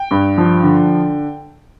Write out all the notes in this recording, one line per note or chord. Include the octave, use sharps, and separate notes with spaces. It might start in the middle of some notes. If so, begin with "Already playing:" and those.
Already playing: G5
G2
F3
D3